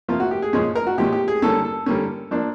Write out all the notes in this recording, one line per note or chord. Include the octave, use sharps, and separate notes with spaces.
C3 F3 A#3 F4
F#4
G4
G#4
A#2 F3 G#3 C#4 G#4
A#4
F#4
A#2 F3 G#3 C#4 G4
G4
G#4
D3 G3 A#3 C#4 A4
A4
D3 G3 A#3 C#4
F3 A#3 D4